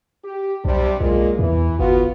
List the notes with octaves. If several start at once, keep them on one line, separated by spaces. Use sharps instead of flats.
G4
B1 C3 G3 D4
B1 A#2 G#3 F4
E2 E3
G1 B3 F4 F#4